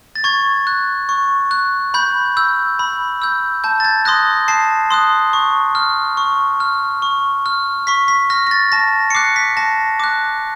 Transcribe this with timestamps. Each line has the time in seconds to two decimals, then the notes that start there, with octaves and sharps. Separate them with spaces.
0.16 A6
0.24 C#6 G#6
0.67 F#6
1.09 C#6
1.51 F#6
1.94 B5 G6
2.37 E6 G6
2.79 B5
3.22 E6 G6
3.64 A5 G6
3.80 A6
3.84 G#6
4.05 C6 D#6 F#6 A#6
4.48 A5 C7
4.90 C6 D#6 F#6
5.33 C#6
5.75 F6
6.17 C#6
6.60 F6
7.02 C#6
7.46 F6
7.87 C#6 B6
8.08 B6
8.30 F6 A#6
8.47 A#6
8.51 A6
8.72 A5 A#6
9.10 C#7
9.15 D6 F#6 C7
9.36 B6
9.57 A5 A#6
10.00 D6 F#6